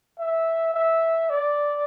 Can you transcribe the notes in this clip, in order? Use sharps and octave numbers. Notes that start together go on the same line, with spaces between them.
E5
E5
D5